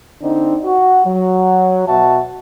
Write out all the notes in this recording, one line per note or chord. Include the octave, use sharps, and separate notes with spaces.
D3 C4 D4 D#4
F#4
F#3
B2 F#4 E5 A5